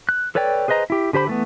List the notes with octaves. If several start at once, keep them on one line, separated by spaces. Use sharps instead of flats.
F#6
A4 B4 C#5 D5 G5
G#4 B4 C5 D#5 A#5
E4 G4
D3 G4 C5 B5
E3 A3 B3